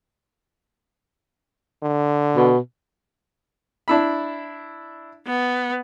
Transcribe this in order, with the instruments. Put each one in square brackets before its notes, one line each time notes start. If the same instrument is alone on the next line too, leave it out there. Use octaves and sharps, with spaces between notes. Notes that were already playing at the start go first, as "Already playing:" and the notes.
[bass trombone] D3
[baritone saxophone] B2
[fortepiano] D4 E4 B5
[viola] B3